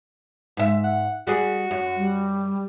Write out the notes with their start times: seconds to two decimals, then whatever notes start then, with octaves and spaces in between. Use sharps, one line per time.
0.57 G#2 E5
0.84 F#5
1.27 G3 F#4 G#4
1.71 F#2
1.97 G3